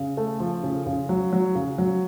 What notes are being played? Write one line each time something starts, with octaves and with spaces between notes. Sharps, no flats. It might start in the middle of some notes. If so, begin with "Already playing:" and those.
Already playing: C#3
A3
F3
C#3
C#3
F#3
F#3
C#3
F#3